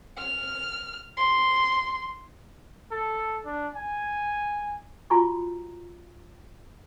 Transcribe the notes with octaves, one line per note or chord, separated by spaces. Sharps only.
F6
C6
A4
D4
G#5
F4 F#4 G#5 A#5 C6 C#6